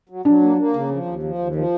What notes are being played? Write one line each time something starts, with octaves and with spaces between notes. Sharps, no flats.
F#3
F#3 D4
A#3
A#3
C#3
F3
D#2
F3
D#2
F3